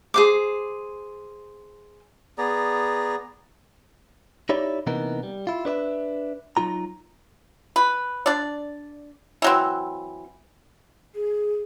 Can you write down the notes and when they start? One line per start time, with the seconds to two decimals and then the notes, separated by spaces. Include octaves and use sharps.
0.14 G#4 C5 D6
2.38 B3 G#4 D5 A#5
4.49 D#4 E4 G4 C#5 D5
4.87 C3 E3 A#3 B3 D#4 A#4
5.23 G3
5.47 E4 F4
5.65 D4 B4 D5 E5
6.57 F#3 D#4 F4 A#5
7.76 B4
8.26 D4 D5
9.42 E3 F#3 C4
11.15 G#4